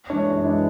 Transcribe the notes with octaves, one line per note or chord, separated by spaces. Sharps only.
E3 G#3 D4 C#5
F#2
E3 G#3 D4